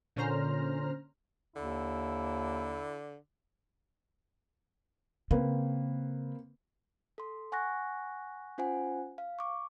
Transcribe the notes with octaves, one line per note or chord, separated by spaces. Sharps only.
A#2 D3 C#4 C5 A#5 F6
D#2 D3 E4
C#3 A#3 C4 B4
A4 C6
F#5 G#5 C#6 F#6 A#6
C#4 F4 C5 F#5 G#5
F5
C#6 D6